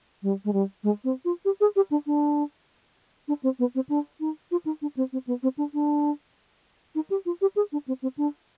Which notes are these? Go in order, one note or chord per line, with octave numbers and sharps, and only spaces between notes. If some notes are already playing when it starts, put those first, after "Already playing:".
G3
G#3
G3
G#3
C4
F4
G4
G#4
G4
D4
D4
D4
C4
B3
C4
D4
D#4
F4
D#4
D4
C4
C4
B3
C4
D4
D4
D#4
G4
F4
G4
G#4
D4
C4
C4
D4